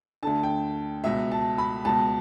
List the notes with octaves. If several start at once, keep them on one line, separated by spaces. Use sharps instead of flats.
D2 D3 A5
G5
C#2 B2 E5
A5
B5
C#2 B2 A5